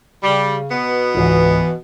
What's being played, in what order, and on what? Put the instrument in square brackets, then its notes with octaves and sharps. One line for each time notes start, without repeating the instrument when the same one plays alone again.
[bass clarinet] C#3 [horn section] G3
[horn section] B2 B3
[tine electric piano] G1 C#2 G#2 [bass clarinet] E3